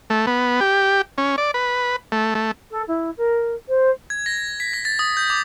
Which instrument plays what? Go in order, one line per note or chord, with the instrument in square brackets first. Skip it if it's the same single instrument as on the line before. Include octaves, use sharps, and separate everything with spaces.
[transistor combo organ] A3
B3
G4
C#4
D5
B4
A3
A3
[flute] A4
E4
A#4
C5
[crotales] G#6
A#6
B6
A#6
A6
D#6
G6
D6